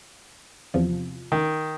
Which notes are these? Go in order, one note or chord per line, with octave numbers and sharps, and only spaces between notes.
E2 C3 F3
D#3